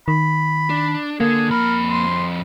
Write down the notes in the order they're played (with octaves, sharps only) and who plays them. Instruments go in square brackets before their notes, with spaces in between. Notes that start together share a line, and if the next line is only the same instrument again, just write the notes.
[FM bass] D#3 [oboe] B5
[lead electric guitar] D4
[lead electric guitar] D3 A4 [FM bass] A#3 [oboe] G#4
[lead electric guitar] F2 B5 [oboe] A#4
[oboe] C6